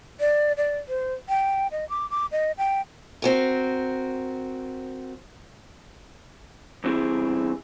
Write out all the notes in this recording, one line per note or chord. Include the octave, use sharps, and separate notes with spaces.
D5
D5
C5
G5
D#5
D6
D6
D#5
G5
C4 F#4 A#4
E2 G2 C4 E4 G4 G#4